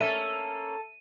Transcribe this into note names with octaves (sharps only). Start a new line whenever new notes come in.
A#3 C#4 A4 E5 D#7